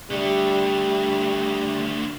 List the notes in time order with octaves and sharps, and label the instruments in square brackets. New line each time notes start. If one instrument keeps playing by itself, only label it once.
[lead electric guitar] D3 A3 [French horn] G3